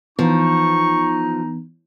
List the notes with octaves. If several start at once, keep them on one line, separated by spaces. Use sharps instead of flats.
E3 F3 B3 D#4 C#6